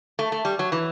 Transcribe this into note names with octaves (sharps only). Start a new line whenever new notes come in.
A3
A3
G3
F#3
E3